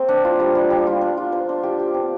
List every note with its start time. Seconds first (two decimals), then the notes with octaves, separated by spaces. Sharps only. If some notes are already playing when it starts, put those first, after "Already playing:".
Already playing: A#3 C4 G#4 C5
0.09 D4
0.25 F4
0.40 G3
0.55 G3
0.70 G3
0.87 F4
1.01 D4
1.17 F4
1.32 C5
1.49 D4
1.63 G4
1.79 G4
1.94 C4